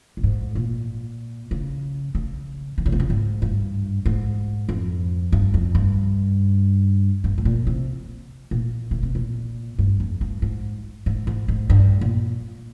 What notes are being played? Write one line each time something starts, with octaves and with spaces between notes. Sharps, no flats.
A#2
G#2
A#2
C#3
C#3
D#3
C#3
C3
C#3
G#2
G2
G#2
F2
G2
F2
G2
G2
G#2
A#2
C3
A#2
C#3
C3
A#2
G2
F2
G2
G#2
G#2
G#2
G#2
G2
A#2